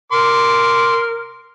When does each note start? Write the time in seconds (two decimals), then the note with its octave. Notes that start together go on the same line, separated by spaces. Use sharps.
0.12 A#4 C6 D6